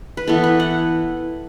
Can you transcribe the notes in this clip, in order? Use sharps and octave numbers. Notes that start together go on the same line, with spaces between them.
B4
E3 B3 E4 A4
B4
F#5